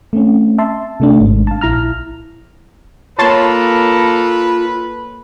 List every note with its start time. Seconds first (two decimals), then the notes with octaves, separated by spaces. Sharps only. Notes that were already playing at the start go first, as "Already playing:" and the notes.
0.13 A3 C4 C#4
0.58 E5 A5 C6
1.00 C3 A3 D4
1.21 G#1 G#2
1.47 F5 A5
1.61 A#1 E4 A#5 F6
3.19 A#3 F4 A4 B4 C#5 A5 C6